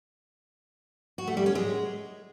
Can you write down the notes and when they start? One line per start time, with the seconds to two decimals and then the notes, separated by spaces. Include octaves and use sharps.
1.18 F#4
1.27 A3
1.37 G3
1.46 C#4
1.55 G#3